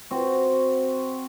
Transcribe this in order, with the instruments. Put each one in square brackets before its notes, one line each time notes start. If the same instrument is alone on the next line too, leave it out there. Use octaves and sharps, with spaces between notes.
[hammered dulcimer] C4 F#4